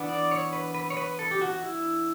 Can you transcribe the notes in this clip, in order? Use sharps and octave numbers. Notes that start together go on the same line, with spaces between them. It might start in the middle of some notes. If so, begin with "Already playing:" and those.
Already playing: E3 B3 D4
D5
C#5
B4
B4
C#5
B4
A4
G4
F#4
E4